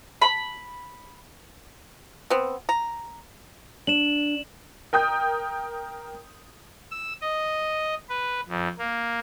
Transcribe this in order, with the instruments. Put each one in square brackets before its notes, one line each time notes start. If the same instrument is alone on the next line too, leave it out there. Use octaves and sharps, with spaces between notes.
[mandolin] B5
[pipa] B3 C4
A#5
[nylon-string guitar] D4 [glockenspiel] E7 F#7
[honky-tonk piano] A#4 G5 D#6 G6
[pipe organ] E6
D#5
B4
F2
A#3